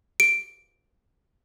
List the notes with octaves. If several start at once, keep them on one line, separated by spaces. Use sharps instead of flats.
D7